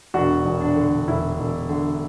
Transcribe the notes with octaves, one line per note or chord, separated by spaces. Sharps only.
E1 D4 F#4
E1
D4
D3
E1 E4
E1
D3